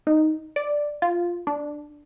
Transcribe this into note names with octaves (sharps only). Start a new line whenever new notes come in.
D#4
D5
F4
D4